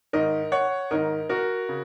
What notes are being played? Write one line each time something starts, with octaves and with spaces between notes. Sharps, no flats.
G#2 D#3 A#4 D#5
C#5 F#5
G#2 D#3 A#4 D#5
F#4 A#4
C#3